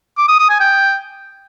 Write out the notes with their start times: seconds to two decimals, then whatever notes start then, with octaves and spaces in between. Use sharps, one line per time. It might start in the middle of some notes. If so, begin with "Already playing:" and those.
0.18 D6
0.28 D#6
0.39 D#6
0.50 G#5
0.60 G5